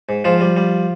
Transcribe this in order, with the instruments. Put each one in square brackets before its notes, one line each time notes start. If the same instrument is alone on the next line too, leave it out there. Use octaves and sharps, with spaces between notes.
[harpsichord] G#2
G#2 F3 F4
G3
G3